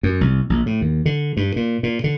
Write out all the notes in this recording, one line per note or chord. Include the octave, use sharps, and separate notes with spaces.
F#2
C2
A#1
A2
D#2
D3
G2
A#2
A#2
D3